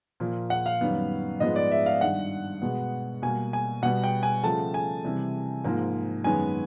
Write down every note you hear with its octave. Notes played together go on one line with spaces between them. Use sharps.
A#2 F3 A#3
F#5
F5
F#2 D#3 G3 B3
G#2 F3 G#3 B3 D#5
D5
E5
F5
G2 D#3 G3 F#5
B2 G#3 B3
B2 G3 A#3 G#5
G#5
B2 G3 B3 F#5
G5
G#5
C#3 F3 A3 A5
G#5
C3 E3 G3
G#2 F3 A#3
F#2 D#3 G#3 B3 G#5